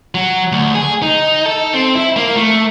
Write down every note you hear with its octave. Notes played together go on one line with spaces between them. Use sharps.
F#3
D2
G#4
D#4
A4
C4
E4
A#3
A3